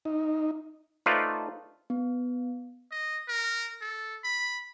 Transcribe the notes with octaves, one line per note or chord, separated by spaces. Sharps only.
D#4
A3 D#4 F4 B4 C5 D5
B3
D#5
A#4
A4
B5